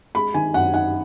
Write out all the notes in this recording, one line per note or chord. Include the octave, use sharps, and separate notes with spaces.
G#3 B5
D#3 G#5
F#2 F#5
D#4 F#5